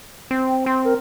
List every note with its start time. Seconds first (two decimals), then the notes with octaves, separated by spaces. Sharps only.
0.31 C4
0.48 G5
0.66 C4 C6
0.84 A#4